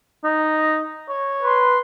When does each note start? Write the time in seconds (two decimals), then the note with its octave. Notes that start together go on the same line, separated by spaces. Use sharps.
0.24 D#4
1.09 C#5
1.43 B4 C6